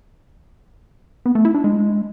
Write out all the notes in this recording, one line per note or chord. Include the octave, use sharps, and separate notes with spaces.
B3
A3
E4
D4
G#3